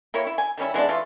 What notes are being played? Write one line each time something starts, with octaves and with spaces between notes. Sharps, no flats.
A#3 E4 G4 C#5
E4
G#5
D#3 G3 C#4 E4
E3 G#3 B3 D4
E3 A3 F4 A4